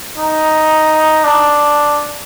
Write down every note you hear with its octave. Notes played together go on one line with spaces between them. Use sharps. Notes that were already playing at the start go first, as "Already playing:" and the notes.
D#4
D4